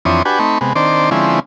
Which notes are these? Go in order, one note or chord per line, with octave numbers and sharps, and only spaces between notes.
F2 E3 C4 D4 C#5 D#6
D4 F#4 G4 B4 G#5
A3 C4 D#4 B5 C#6
C3 G#3 B3
D#3 C4 D4 C5 D5
D3 F3 G#3 C4 C#4 E4